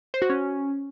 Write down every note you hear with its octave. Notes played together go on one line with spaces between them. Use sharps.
C5
F#4
C#4